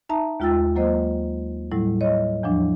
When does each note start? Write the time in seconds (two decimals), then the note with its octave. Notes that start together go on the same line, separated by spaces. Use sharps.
0.09 D#4 E5 A5 A#5
0.40 D#2 G#3 F4 G5 E6 A6
0.76 F#3 A#3 C5 D#5
1.72 A2 F#3 G3 E4
2.01 C#5 D#5
2.43 E2 F3 F#3 D4